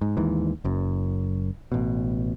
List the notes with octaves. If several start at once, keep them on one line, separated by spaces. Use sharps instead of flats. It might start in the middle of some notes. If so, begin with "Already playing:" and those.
G#2
D#2 G#2 E3
F#1 F#2
A1 B2